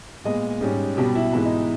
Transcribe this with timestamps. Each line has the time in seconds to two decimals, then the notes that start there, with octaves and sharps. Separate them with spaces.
0.24 A#2 G#3 B3 D#5
0.61 G#2 G3 C#4
0.97 B2 G3 B3 G4
1.15 E4
1.33 G#2 E3 G#3 B3 E4
1.45 D#4